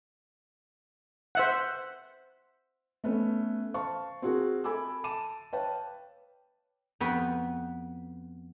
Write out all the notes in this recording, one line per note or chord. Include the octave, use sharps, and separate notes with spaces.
C5 E5 F#5
A3 B3 C#4
C5 F5 A5 C#6
C4 F4 F#4 G#4 A#4
A4 G#5 B5 D6 E6
A5 D6 D#7 E7
B4 C#5 F5 G5 A5
F2 B3 F#4 B4 G5